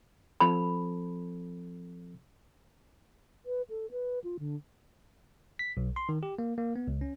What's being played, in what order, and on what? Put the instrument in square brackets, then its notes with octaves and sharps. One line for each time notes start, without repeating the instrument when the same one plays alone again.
[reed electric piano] F3 C4 A4 [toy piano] B5
[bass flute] B4
A4
B4
F4
D3
[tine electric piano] B6
B1
C6
D#3
G4
A#3
A#3
B3
C#2
C#4